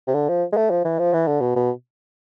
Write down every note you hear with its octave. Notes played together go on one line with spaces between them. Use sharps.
C3
D3
F3
G#3
A3
F3
E3
F3
E3
D3
B2
B2